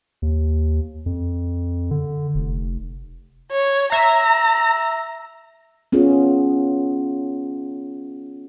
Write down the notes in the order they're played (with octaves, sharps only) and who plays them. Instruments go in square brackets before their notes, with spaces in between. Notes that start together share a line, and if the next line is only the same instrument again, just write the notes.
[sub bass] D#2
F2
D3
F1
[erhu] C#5
[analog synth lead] E5 [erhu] A#5
[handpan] B3 C#4 F4 G#4